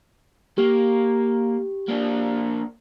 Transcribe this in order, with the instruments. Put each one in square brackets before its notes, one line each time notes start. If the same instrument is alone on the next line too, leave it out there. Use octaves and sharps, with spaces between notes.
[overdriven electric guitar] A#3 [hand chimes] G4
[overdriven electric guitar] A#3 D4